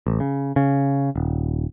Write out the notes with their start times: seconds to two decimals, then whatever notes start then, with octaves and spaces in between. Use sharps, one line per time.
0.07 A1
0.20 C#3
0.56 C#3
1.16 D#1